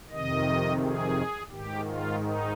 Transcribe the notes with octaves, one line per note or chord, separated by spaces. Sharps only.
F2 C3 D#3 D#5
G#4
G#2 D#3 G4
F4
D#4